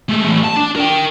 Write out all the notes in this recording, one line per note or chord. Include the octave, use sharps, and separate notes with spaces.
G#3 A3
E3 A3
A5
D4
A#4 G5